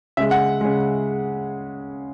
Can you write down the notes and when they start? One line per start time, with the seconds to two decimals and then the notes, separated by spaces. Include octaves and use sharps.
0.17 C#3 G#3 E5
0.31 F#5
0.61 C#3 G#3